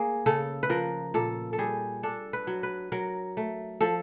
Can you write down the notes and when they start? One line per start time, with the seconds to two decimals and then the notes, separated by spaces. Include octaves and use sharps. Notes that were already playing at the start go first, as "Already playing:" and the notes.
Already playing: A#3 G#4
0.26 C#3 A4
0.63 B4
0.69 F3 A#4
1.14 A#2 A4
1.53 A4
1.58 G3 G#4
2.03 D4 A4
2.33 B4
2.47 F#3
2.63 B4
2.92 F#3 A#4
3.37 A3
3.81 F3 A4